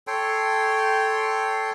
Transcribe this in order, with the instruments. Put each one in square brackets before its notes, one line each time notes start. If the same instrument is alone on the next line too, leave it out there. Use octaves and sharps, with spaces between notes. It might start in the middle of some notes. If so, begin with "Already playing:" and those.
[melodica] A4 C#5 G5 C6